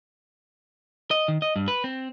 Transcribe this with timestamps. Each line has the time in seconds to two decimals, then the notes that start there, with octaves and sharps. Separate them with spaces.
1.11 D#5
1.28 D#3
1.42 D#5
1.56 G2
1.68 B4
1.84 C4